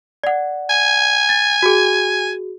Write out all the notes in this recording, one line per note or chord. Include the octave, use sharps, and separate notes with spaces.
D5 F#5
G#5
A6
F#4 G#4